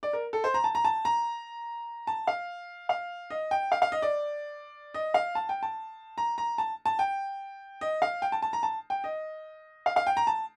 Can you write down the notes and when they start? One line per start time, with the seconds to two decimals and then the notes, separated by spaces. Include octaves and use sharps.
0.03 D5
0.13 A#4
0.33 A4
0.44 C5
0.54 A#5
0.64 A5
0.75 A#5
0.85 A5
1.05 A#5
2.07 A5
2.27 F5
2.89 F5
3.30 D#5
3.51 G5
3.72 F5
3.82 F5
3.92 D#5
4.02 D5
4.94 D#5
5.14 F5
5.35 A5
5.49 G5
5.63 A5
6.18 A#5
6.38 A#5
6.58 A5
6.86 A5
6.99 G5
7.81 D#5
8.02 F5
8.22 G5
8.32 A5
8.42 A5
8.53 A#5
8.63 A5
8.90 G5
9.04 D#5
9.86 F5
9.96 F5
10.07 G5
10.17 A#5
10.27 A5